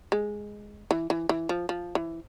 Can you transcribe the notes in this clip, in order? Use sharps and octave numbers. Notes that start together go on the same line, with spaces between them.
G#3
E3
E3
E3
F3
F3
E3